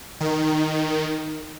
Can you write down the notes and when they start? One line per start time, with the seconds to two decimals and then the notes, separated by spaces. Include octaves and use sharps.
0.20 D#3